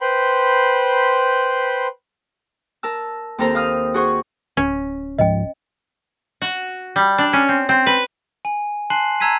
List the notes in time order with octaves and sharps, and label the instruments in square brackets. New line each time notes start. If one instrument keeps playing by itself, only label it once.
[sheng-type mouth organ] B4 C5 G5 B5 C6
[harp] A#4 A5 E6
D#2 C4 A4 A#4 C5 A#5
F5 D#6 F6
F#4 G#4 C5 F#5 C#6
[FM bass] D1 [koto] C#4
[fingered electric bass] C#2 G#2 F3 [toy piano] D#5 G5
[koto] F#4
G3
D4
C#4
C4
C4
B4
[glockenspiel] G#5
G#5 A5 C6 F#6 C7 F#7
A5 A#5 E6 G#6 B6 D#7